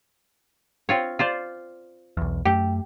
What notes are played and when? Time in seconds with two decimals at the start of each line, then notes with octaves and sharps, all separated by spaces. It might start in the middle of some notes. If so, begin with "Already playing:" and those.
0.89 C4 F4 C#5
1.19 F4 C5 D5
2.17 B1 E2
2.45 F#2 A3 G4